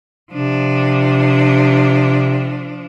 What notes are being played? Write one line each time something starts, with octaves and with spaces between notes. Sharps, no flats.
C3 F3 D4